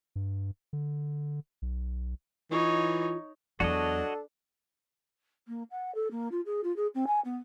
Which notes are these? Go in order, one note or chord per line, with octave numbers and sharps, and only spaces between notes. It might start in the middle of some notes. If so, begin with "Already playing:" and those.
G2
D3
B1
E3 D#4 F4 C#5
E2 F#3 D4 F#4 A4 C#5 D#5
A#3
F#5
A4
A#3
F4
G#4
F4
G#4
C4
G#5
B3